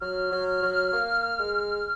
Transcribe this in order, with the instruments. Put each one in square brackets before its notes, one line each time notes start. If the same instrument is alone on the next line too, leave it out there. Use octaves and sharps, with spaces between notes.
[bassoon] F#3 [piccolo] F6
[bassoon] F#3
F#3
A#3
G#3